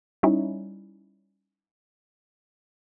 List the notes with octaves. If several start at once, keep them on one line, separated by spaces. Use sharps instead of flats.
G3 C#4 D#4 E4